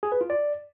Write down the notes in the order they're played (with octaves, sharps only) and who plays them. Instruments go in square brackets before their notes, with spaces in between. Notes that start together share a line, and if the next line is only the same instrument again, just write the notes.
[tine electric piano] G#4
B4
F4
D5